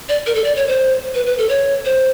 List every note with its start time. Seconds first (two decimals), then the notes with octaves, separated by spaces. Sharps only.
0.09 D5
0.26 A#4
0.35 A4
0.44 D5
0.56 C#5
0.68 C5
1.15 B4
1.26 B4
1.38 A4
1.49 C#5
1.85 C5